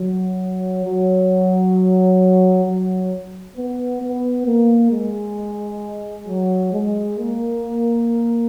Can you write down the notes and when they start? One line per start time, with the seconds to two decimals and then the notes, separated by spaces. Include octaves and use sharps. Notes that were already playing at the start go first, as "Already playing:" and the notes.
Already playing: F#3
0.84 F#3
2.66 F#3
3.56 B3
4.02 B3
4.47 A#3
4.92 G#3
6.28 F#3
6.73 G#3
7.18 A#3